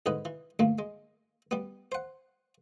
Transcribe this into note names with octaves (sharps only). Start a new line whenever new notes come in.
C2 G#2 D3 B4 D#5
E3
D2 G2 A3 A#3
G#3
G3 B3
C5 F#5